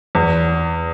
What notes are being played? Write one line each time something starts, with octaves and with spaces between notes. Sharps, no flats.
E2